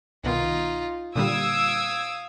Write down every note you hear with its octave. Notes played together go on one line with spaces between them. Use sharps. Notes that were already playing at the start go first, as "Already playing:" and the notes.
C2 B2 D#3 D#4 F4
A#2 D3 G3 F5 D#6 E6 G#6 D7